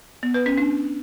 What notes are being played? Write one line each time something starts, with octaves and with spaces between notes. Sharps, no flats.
B3
B4
C#4
D4